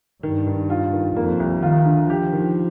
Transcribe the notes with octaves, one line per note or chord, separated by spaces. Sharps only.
G2 D#3
D#3
F4
D#3
F2 A#3
C2
D#3 F4
D3
F3 G4
D#3